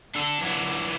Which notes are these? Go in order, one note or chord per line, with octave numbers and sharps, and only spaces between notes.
D4 A4
E3 F#3 D4